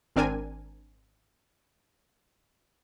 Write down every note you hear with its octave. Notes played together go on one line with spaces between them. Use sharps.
G#1 C4 D4 A#4 G#5 D#7